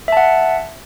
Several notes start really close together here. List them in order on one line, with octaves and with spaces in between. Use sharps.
E5 A5 F#5